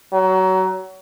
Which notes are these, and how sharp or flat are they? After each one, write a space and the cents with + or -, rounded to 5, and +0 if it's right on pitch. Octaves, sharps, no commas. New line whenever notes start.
F#3 +25